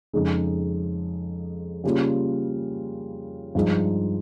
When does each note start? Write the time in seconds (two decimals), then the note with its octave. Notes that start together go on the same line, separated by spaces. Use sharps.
0.13 F2 C#3 G#3 D#4
1.84 C#3 G3 A#3 C#4 F4
3.55 G2 F3 G#3 D#4